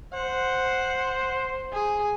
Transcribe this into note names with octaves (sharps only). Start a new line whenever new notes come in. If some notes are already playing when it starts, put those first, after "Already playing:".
C5 F#5
G#4